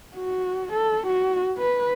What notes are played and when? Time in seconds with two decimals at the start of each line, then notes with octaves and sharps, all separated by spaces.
0.16 F#4
0.73 A4
1.07 F#4
1.58 B4